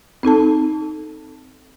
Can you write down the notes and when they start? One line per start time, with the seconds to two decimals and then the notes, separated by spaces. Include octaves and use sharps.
0.23 C4 D#4 A4 A5